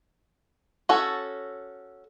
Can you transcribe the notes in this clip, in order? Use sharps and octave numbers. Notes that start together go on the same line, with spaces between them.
C#4 F#4 A4